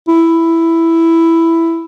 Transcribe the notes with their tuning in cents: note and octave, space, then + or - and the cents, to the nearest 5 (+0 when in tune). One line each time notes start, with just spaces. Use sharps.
E4 +5